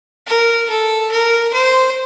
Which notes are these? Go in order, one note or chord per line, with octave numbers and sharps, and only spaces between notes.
A#4
A4
A#4
C5